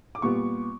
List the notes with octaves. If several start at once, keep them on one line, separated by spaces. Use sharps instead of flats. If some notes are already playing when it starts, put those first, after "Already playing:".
D6
A#2 G3 B3 C#6